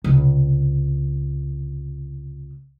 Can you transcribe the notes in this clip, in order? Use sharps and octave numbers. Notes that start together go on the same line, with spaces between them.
C#2 C3